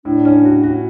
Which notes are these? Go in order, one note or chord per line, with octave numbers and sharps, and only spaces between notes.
A2 D4
C#4
F#4
F#4